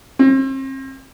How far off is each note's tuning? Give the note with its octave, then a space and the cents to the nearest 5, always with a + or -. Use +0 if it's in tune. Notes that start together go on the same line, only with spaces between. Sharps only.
C4 +40